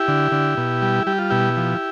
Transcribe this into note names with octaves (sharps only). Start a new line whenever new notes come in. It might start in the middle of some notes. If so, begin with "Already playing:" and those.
Already playing: E4 G4
D3
D3
B2
G3
G3 G4
F4
B2 E4 G4
F3